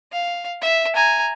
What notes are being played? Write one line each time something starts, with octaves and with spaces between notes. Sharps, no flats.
F5
E5
G#5 A#5